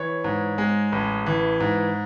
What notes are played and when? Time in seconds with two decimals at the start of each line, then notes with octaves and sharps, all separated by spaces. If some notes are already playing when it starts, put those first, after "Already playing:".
Already playing: E3 C#5
0.24 G#2
0.58 G#3
0.92 A1
1.26 E3
1.60 G#2